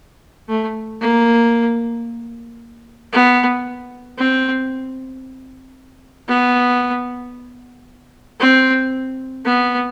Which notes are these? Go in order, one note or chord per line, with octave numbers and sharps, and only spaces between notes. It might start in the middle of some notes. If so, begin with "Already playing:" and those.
A3
A#3
B3
C4
B3
C4
B3